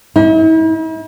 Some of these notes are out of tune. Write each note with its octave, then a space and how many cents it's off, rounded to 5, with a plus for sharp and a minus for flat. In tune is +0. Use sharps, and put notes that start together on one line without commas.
E4 -45